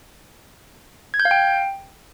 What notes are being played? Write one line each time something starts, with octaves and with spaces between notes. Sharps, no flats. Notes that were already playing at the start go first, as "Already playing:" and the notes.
G#6
G6
F5
G5